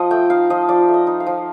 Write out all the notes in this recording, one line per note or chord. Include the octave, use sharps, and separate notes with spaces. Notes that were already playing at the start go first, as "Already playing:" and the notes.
Already playing: F3 D#5
A3 G5
D#4 F5
F3 D#5
F3 D5
A3
D#5
D#4
F5
F3